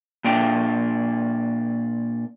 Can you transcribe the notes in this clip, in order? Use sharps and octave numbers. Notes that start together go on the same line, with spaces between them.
A#2 D4 G5